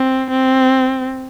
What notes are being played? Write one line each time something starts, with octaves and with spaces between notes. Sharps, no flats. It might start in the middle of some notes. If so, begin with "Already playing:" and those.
Already playing: C4
C4